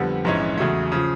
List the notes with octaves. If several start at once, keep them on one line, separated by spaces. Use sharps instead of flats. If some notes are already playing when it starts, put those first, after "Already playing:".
Already playing: F2 D3 G3 B3
A#1 G#2 E3 G#3 C#4
E2 C#3 F#3 A3
C#3 F3